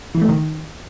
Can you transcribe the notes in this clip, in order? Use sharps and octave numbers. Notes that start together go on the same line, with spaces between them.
E3
A3
D#3